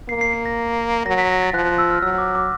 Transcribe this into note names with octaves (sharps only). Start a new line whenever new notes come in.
A#3 C7
C7
C7
A#6
F#3 A#6
B6
A#6
A6
F3 F#6
F#6
E6
F6
F#3 E6
D6
D6